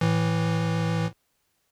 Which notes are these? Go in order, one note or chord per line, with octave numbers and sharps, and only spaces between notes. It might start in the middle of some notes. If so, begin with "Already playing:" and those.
A2 E3